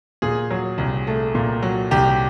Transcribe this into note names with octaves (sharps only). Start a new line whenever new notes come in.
A#2 G#4
F#3
C2
A3
A#2
F#3
C2 G4